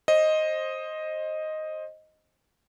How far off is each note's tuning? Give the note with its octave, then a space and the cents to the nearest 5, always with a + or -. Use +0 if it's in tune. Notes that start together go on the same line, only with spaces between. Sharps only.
C5 +20 D#5 +0